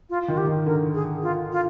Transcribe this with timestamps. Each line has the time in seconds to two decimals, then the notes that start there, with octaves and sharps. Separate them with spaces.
0.10 F4
0.28 D#3 F4
0.37 G4
0.47 D#3
0.66 D3 A#4
0.94 G#4
1.23 F4
1.52 F4